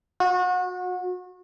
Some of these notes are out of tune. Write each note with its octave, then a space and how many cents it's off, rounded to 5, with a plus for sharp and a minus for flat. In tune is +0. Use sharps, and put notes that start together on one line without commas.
F#4 -30